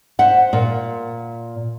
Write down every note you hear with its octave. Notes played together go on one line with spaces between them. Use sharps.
C5 E5 F#5
A#2